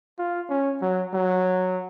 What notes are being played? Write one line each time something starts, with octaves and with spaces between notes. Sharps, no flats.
F4
C#4
F#3
F#3